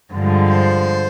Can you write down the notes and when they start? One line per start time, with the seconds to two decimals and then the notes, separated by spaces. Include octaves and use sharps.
0.13 G2 D3 F3 G#3
0.49 C5